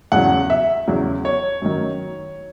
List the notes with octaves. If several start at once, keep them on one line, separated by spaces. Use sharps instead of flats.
E2 C#3 F#3 F#5
E5
E2 C#3 F#3
C#5
F#2 D#3 F#3